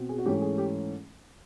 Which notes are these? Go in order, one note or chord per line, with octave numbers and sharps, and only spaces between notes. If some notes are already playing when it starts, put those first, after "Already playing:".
Already playing: B2 C4
G#4
F#4
G#2 E3 A3 C#4 G4
G#4
G4